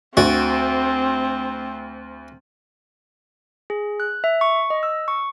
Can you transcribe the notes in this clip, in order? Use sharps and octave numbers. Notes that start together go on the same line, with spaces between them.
D2 C4 F#4
G#4
F#6
E5
C#6
D#5
E6
C#6